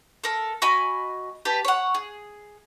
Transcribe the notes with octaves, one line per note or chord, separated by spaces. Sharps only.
A4 A#4
F#4 D#5 G#5 B5
G4 B4 A5
C#5 F#5
G#4